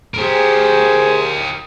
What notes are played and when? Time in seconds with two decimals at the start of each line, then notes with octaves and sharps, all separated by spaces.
0.14 G4 G#4 A#4 C5